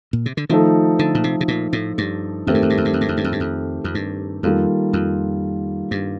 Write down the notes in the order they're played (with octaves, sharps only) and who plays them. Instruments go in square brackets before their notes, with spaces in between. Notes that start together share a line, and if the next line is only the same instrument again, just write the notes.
[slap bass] A#2
C3
D3
[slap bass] D#3 [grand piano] F3 A3 D#4 A4
[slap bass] D3
A#2
C3
C3
A#2
A2
G2
[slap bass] F2 [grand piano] D#3 A3 C4 G4 A#4
[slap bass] G2
F2
G2
F2
G2
F2
G2
F2
G2
F2
G2
F2
F2
G2
[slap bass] F2 [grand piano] D#3 G3 A#3 F4 A4
[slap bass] F2
G2